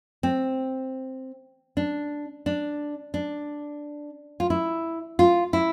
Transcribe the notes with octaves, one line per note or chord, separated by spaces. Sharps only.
C4
D4
D4
D4
F4
E4
F4
E4